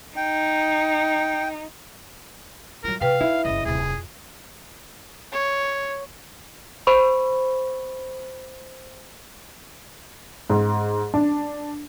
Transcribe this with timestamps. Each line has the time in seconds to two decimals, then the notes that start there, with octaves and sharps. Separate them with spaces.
0.17 D#4 G5
2.84 F#3 F4 A#4
3.01 C3 B4 F5 G5 F6
3.21 D#4 E4
3.45 F#1 C#3 D#5
3.65 D1 C3 G#4
3.79 F2
5.32 C#5
6.87 C5 B5 C#6
10.50 G#2
11.14 D4